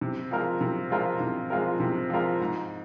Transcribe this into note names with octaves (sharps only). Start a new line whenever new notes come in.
C3
F3 G#3 F4 A#4
C3
F3 G#3 F4 A#4
C3
F3 G#3 F4 A#4
C3
F3 G#3 F4 A#4
G#2